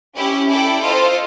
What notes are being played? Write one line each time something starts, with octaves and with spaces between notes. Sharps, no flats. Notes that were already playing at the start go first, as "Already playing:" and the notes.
C#4 E4 G4
E4 A4 D5 G5
F4 A4 C5 D#5